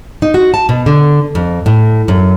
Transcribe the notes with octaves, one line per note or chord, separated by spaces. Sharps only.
D#4
F#4
A5
B2
D3
F2
A2
F#2